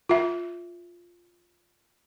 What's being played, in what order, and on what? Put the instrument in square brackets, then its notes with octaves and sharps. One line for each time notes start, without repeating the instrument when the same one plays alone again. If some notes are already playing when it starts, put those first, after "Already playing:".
[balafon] F4 E5